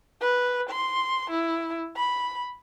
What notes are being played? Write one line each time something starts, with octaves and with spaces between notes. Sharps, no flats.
B4
C6
E4
B5